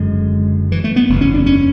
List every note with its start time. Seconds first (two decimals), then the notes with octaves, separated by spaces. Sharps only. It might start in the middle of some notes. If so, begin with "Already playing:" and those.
Already playing: F#1 F#2 D3 G#3
0.72 E3
0.84 A3
0.96 B3
1.09 F#1 E2 C#3
1.21 C#4
1.34 D4
1.46 C#4